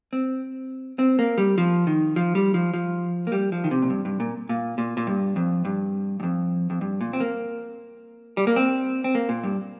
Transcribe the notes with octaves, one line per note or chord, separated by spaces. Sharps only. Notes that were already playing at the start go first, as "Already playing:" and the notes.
C4
C4
A#3
G3
F3
D#3
F3
G3
F3
F3
A#3
G3
F3
D#3
C3
A#2
G2
G2
A#2
A#2
A#2
A#2
G2
F2
G2
G2
F2
F2
G2
A#2
C4
A#3
G3
A#3
C4
C4
A#3
A#2
G2